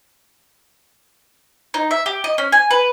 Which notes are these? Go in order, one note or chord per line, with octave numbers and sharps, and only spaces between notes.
D#4
E5
G4
D#5
C#4
G#5
B4